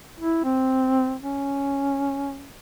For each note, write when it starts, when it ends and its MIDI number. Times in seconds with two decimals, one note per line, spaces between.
0.21 0.42 64
0.44 1.16 60
1.23 2.46 61